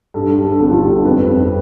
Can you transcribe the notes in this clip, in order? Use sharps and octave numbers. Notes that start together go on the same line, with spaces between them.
G2 A4
G2
A4
G1
F4
G2 G4
A4
F2 B4
F2